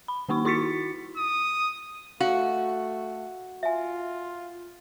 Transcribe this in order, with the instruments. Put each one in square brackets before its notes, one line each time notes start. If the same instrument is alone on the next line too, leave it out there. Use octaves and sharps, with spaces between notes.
[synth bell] B5
D#3 A#3 D#4 C#6
E4 F#4 C#6 A6 B6 C#7
[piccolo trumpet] D#6
[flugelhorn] A3 [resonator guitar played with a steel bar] F#4 [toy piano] F5
[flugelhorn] F4 [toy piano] E5 G#5